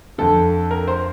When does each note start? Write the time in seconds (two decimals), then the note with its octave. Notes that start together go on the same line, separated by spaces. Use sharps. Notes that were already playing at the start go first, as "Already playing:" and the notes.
0.18 F2 D3 A4
0.71 A#4
0.88 C5